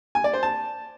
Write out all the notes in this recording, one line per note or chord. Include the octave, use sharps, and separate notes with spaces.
G#5
D5
C5
A5